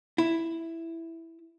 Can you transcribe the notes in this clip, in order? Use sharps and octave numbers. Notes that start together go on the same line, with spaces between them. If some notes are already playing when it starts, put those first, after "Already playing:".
E4